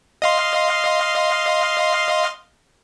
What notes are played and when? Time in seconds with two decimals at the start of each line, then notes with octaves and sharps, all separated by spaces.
0.22 D#5 F5 C6